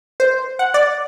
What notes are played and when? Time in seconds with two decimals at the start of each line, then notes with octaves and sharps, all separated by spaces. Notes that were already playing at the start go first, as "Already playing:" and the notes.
0.20 C5
0.59 F#5
0.74 D5